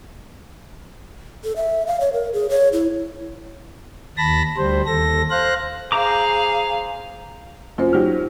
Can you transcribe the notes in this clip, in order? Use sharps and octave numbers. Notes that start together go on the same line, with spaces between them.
A4
E5
F5
C#5
A#4
G#4
C#5
E4
D#2 A5 B5 A#6
D2 G3 C5
D#2 A4 A#6
C5 F5 F#6 A#6
G#4 C5 F5 A#5 D6
F#2 F4 C5
F#3 D#4 G4 F6